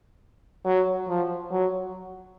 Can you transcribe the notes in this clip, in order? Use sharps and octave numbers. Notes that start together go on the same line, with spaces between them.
F#3
F3
F#3